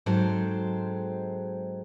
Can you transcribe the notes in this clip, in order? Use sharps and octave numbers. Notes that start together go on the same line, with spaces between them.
G#2 F#3 G#3 C4 A4 C5